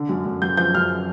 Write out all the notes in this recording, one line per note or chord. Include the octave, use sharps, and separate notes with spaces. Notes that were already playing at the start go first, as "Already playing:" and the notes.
Already playing: D3
F#2
F#2
F#2 G6
F3 G6
F#2 F6